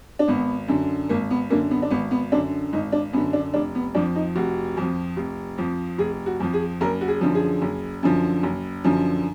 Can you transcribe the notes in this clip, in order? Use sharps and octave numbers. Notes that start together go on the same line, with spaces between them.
D4
G#1 B3
F#2 D3
G#1 A#3
B3
F#2 D3 A#3
B3
D4
G#1 B3
B3
F#2 D3 D4
G#1 D#4
D4
F#2 D3 B3
D4
F1 D4
B3
F2 F3 D4
D#4
F1 F#4
F2 F3
F1
F2 F3
F1 G#4
F#4
F2 F3
G#4
F#1 A#4
F#4
G#4
F#2 D3 F3
G#4
F#1
F#2 D3 F3
F#1
F#2 D3 F3